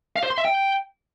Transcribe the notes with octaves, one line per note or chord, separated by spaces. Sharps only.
F5
C5
C6
E5
G5